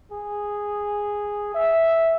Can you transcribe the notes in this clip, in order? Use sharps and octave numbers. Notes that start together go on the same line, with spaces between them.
G#4
E5